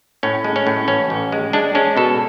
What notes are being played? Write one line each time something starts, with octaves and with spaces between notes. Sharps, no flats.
A2 C#4
G#3
C#4
A2
A1 C#4
A1
G#3
G#3 D4
G#3 C#4
B2 A4